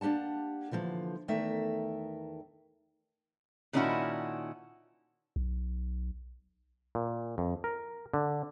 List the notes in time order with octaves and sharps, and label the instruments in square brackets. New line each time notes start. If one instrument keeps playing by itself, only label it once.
[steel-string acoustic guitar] A#3 D4 G4 F#5 A5
D3 E3 F3 A3 A#3
E2 D#3 A3 A#4 E5
[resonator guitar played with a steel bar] A#2 D#3 C#4 D4 E4 F#4
[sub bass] B1
[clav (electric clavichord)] A#2
F2
A#4
D3